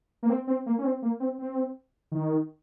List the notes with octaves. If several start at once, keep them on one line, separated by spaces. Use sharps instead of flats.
A#3
C4
C4
A#3
C#4
C4
A#3
C4
C4
D#3